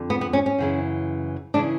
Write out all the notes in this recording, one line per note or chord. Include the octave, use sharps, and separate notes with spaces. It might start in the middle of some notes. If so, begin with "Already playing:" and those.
Already playing: F2 D3
B3
B3
C#4
C#4
F#2 C#3 E3
C#3 E3 D4